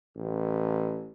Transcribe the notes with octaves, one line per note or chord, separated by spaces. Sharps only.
A1